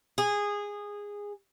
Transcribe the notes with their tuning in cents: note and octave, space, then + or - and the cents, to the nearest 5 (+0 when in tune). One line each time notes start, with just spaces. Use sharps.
G#4 -15